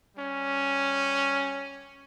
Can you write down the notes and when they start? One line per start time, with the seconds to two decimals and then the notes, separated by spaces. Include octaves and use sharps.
0.16 G3 C#4